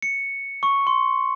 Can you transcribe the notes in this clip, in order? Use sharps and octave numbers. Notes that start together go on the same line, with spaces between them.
C#7
C#6
C6